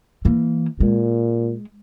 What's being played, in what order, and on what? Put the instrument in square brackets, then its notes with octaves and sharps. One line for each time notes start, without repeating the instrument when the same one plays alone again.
[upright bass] E3 A#3
[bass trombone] A#2 [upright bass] G#3